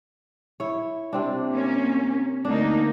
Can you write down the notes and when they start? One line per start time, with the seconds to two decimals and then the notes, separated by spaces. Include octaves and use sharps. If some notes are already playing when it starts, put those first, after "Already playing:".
0.60 E4 C#5
1.13 C3 C4 D4
1.51 A#3 C#4
2.45 D2 A#3 D4 D#4